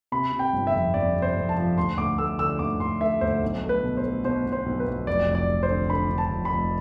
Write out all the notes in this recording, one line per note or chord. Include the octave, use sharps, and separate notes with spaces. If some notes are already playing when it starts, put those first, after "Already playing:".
C3 B5
C3
G5
G1
E5
F2
F2 D5
C3
C5
F2
A5
F3
D2 C6
D2 D6
A3 E6
D3 E6
D2 D6
D2 C6
A3 E5
D2 C5
B1
A3
B4
B2
C5
A3
B2 C5
B2
C5
B1
B4
B1
F1 D5
F1
D5
F1
C5
D3
D3 B5
D3
A5
F1
B5
F1